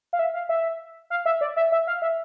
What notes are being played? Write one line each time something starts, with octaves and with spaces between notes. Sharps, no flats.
F5
E5
F5
E5
F5
E5
D5
E5
E5
F5
E5